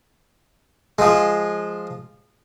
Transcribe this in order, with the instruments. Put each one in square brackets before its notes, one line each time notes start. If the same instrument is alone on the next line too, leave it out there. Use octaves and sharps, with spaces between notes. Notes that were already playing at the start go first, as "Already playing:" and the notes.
[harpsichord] F3 G#3